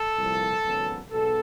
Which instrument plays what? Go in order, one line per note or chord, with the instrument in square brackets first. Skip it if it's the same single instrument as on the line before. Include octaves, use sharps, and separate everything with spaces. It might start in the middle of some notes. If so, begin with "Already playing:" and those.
Already playing: [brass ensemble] A4
C2 A#2 F3
G#1 F#2 C#3 F#3 B3
B1 B2 G#3 B3 A4